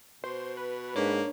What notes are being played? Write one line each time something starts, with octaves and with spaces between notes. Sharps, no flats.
B2 C5
B4
G#2 A#3 D4 C#5